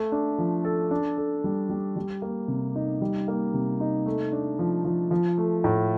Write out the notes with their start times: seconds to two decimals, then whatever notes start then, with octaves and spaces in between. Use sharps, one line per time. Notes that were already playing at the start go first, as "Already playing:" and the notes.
Already playing: A3
0.12 D4
0.38 F3
0.65 A4
0.91 D4
1.18 A4
1.44 G3
1.69 G3
1.96 G3
2.22 A#3
2.48 C3
2.75 D#4
3.01 G3
3.28 A#3
3.54 C3
3.80 D#4
4.06 A3
4.32 D4
4.59 F3
4.85 F3
5.11 F3
5.38 A3
5.64 A2